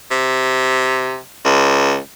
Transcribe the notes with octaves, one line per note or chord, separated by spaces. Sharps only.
C3
C#2